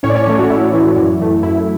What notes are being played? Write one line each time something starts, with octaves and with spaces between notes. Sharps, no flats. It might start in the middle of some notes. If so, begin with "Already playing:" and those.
A2 C#4 C#5
D5
C#4 C#5
E3 A3 C#4 C#5
F#4
A2 E4
E3 A3
F#2
E3 A3
F#2 E4